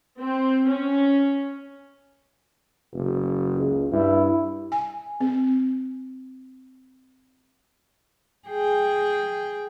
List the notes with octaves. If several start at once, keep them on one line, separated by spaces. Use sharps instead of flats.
C4
C#4
F#1
C#2
G2 E4
G#5
C4
G#4 G5